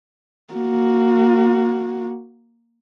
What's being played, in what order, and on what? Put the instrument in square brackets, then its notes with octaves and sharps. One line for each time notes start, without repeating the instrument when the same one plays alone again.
[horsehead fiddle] A#3 F#4